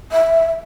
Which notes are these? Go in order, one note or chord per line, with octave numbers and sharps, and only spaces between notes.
E5